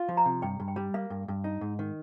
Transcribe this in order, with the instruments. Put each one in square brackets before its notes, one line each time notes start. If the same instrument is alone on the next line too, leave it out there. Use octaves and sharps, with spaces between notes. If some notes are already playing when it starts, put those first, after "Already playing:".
Already playing: [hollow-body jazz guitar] F4
F3
[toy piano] A#5
[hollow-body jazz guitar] C3
[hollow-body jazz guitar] G2 [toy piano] G5
[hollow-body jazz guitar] G2
[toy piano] G5
[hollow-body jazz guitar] G3
[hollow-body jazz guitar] A#3 [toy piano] F5
[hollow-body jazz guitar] G2
G2
D#4
G#2
D#3